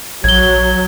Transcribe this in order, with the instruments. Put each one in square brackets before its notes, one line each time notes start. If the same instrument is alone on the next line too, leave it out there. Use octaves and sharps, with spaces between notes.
[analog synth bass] A#1 [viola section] F#3 [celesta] G#6 G7